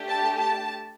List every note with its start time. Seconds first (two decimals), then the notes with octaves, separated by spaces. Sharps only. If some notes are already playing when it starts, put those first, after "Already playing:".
Already playing: A3 D4 G4
0.08 A5
0.38 A5